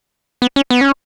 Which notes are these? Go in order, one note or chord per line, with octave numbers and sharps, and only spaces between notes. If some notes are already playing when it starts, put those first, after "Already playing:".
B3
C#4
B3
C#4